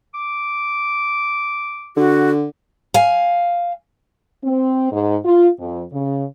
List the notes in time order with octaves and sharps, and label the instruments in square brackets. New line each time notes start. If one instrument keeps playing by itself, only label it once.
[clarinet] D6
[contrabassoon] D3 [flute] F#4
[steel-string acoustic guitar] F5 G#5
[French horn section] C4
G#2
F4
F2
C#3